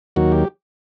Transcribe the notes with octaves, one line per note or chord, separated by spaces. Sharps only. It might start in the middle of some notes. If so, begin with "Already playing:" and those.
D#2 D#3 F#3 F#4
G4